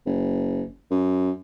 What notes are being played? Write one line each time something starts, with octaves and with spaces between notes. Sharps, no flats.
F#1
F#2